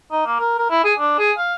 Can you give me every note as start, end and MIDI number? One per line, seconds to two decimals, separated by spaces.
0.12 0.26 63
0.26 0.38 58
0.40 0.56 70
0.58 0.67 70
0.70 0.81 64
0.84 0.94 68
0.99 1.18 62
1.19 1.32 68
1.38 1.55 77